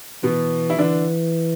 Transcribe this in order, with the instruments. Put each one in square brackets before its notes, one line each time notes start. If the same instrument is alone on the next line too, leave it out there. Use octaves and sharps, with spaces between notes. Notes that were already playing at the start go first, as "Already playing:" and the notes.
[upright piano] B2 B3 [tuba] E3
[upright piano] E4
[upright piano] D3 D4 [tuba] E3